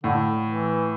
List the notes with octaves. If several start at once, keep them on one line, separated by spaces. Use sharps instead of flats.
A2 D3
E3